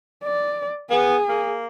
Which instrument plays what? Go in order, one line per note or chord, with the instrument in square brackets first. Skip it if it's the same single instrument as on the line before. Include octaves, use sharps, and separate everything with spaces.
[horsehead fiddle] D5
[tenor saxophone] B3 [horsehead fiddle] G#4
[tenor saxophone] A#3